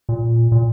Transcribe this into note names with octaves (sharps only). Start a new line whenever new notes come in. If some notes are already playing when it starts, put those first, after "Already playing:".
A#2
A#2